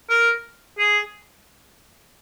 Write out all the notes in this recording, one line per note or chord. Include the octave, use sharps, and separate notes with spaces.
A#4
G#4